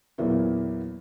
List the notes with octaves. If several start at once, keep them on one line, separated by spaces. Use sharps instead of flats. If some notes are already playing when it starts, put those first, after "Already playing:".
E2 A#2 F#3 A#3 B3 E4